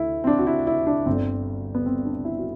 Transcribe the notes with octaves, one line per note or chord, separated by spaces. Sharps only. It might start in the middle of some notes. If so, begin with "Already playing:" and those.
Already playing: D2 D3 E4
C4
D4
F#4
E4
E4
D4
G1 G2 D3 C4
B3
C4
D4
E4
F#4